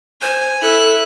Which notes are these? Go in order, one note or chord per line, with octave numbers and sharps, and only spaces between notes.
C5 G#5
E4 A4 F#6